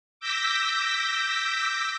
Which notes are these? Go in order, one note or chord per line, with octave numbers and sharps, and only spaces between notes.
D6 E6 G6 A#6 B6